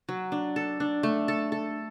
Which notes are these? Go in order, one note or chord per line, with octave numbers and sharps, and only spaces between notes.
F#3
D4
A4
D4
A3
A4
A4